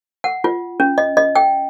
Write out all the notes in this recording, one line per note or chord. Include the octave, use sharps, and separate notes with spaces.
F#5
F4
C#4
D#5
D#5
G5